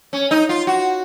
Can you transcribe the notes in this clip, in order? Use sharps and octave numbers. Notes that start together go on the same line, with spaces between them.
C#4
D#4
F4
F#4